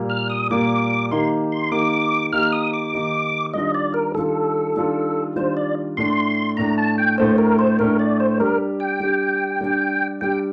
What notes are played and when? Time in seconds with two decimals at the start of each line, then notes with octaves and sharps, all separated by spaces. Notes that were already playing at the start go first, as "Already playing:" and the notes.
Already playing: A#2 G3 A#3
0.10 F6
0.30 D#6
0.50 A#2 G3 A#3 D6
1.11 D#3 A#3 D#4 G4 C6
1.52 C6
1.72 D#3 A#3 D#4 G4 D6
2.32 D#3 A#3 D#4 G4 F6
2.52 D#6
2.73 D6
2.93 D#3 A#3 D#4 G4
3.54 D#3 G3 D4 F4 D#5
3.74 D5
3.94 A#4
4.15 D#3 G3 D4 F4 A4
4.75 D#3 G3 D4 F4
5.36 D#3 G3 D4 F4 C5
5.57 D5
5.97 A2 A3 D4 C6
6.57 A2 A3 D4 A#5
6.78 A5
6.98 G5
7.18 A2 A3 D4 C5
7.38 A#4
7.59 C5
7.79 A2 A3 D4 A#4
7.99 D5
8.20 C5
8.39 G3 D4 G4 A#4
8.80 G5
9.00 G3 D4 G4
9.61 G3 D4 G4
10.21 G3 D4 G4 G5